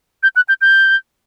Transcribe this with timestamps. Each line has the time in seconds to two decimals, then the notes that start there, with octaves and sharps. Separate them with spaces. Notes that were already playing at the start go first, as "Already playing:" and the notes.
0.23 G6
0.36 F#6
0.49 G6
0.61 G6